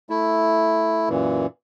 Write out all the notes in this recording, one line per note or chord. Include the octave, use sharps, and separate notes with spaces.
A3 E4
F#2 A#2 E3